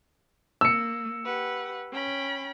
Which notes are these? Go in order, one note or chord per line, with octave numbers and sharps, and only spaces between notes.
A#3 E6 C#7
G4 B4 F#5
C#4 G5 B5